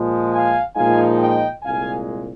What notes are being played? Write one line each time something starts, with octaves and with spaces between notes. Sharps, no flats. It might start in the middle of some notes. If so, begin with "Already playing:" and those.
Already playing: A#2 F3 G#3
F5 G#5
A#2 F3 G#3 D#4 F5 G#5
D#5 G5
C2 A#2 G#3 F5 G#5